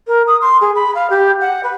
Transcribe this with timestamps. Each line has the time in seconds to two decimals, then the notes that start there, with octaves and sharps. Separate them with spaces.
0.07 A#4
0.27 D#6
0.42 C6
0.61 G#4
0.76 B5
0.95 F5
1.10 G4
1.41 F#5
1.64 B4